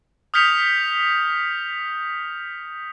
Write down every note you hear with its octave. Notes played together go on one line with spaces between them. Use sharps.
D#6 F6 G6 B6 C#7 F7